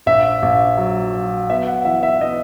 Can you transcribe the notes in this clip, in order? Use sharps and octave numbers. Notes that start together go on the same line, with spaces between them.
A#1 E5
A#1
F#3
F#3
B3 E5
F#5
E3 E5
E5
B3 D#5